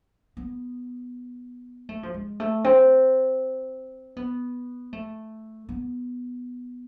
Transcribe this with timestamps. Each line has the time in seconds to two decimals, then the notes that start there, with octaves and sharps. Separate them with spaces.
0.37 B3
1.89 A3
2.03 F3
2.14 G#3
2.40 A3
2.64 C4
4.16 B3
4.93 A3
5.69 B3